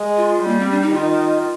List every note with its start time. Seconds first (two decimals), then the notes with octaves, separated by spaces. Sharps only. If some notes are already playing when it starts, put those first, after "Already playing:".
Already playing: G#3
0.17 F4
0.42 G3
0.48 A#3
0.60 C4
0.71 D4
0.82 D#4
0.93 D#3 F4